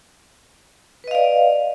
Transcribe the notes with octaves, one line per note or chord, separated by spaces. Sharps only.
B4 D5 D#5 F5